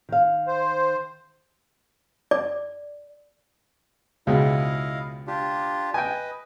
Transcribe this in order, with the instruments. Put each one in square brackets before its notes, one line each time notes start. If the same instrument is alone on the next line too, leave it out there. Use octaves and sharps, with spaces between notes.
[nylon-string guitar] D#3 F5
[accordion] C5
[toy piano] D5
[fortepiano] C#2 B2 G#3 [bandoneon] E4 D#5 F5
[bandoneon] D4 F4 G4
[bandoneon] B4 D#5 [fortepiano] G5 G#5